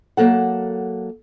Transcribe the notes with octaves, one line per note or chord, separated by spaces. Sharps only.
F#3 A#3 A4 F#5